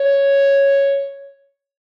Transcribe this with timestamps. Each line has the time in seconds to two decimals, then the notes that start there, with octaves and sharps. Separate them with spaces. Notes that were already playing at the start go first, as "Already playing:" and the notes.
Already playing: C#5